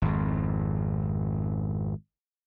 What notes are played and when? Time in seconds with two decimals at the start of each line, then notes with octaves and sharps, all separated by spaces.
0.02 G#1 F2